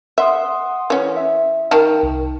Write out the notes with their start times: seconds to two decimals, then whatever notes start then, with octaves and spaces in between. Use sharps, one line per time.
0.18 E5 F#5 C6 D#6
0.90 E3 C#4
1.17 E5
1.71 D#3 A#4 A5
2.03 C2